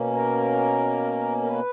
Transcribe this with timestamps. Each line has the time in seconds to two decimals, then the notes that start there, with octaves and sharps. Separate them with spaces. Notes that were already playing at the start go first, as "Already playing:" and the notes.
Already playing: B2 A#3 C#4
0.13 A#4
1.43 A#4
1.47 B4